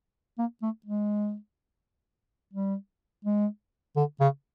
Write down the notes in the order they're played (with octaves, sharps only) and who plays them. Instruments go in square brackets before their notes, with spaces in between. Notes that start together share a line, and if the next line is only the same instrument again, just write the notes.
[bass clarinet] A#3
A3
G#3
G3
G#3
D3
C#3